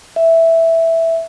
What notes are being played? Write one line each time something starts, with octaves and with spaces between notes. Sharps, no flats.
E5